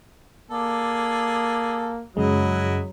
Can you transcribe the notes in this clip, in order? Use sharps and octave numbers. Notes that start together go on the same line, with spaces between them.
A#3 G#4 A4 D5
F#2 C#3 F#3 G#3 E4 F#4 D#5